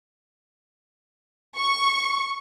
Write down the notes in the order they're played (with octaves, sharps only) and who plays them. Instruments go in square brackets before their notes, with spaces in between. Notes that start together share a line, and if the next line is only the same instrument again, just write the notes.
[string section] C#6